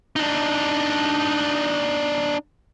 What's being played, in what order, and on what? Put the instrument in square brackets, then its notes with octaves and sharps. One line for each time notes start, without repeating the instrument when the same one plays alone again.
[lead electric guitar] D4 D#4